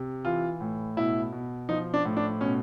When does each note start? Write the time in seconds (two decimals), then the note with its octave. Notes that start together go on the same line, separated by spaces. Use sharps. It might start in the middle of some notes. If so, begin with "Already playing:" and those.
Already playing: C3
0.25 E3 F4
0.61 A2
0.97 B2 E4
1.32 B2
1.69 F3 D#4
1.94 D4
2.05 A2
2.17 D4
2.41 B2 C#4